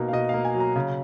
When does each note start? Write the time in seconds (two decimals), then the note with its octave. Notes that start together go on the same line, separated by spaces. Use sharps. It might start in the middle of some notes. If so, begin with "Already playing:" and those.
Already playing: B2 A#3 D#4
0.08 F5
0.13 B2 D#5
0.29 F5
0.34 A#3
0.45 G#5
0.54 F#3
0.60 A#5
0.76 C#3